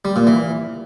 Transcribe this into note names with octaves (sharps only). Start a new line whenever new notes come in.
G3
A#2
E3